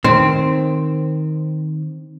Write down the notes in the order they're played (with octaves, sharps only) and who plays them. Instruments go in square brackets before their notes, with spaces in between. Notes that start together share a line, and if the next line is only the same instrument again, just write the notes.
[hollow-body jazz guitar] D#3 [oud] C4